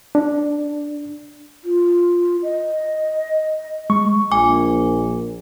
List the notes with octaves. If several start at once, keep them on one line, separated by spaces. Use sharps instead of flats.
D4
F4
D#5
G#3 C#6
A#1 G#5 D6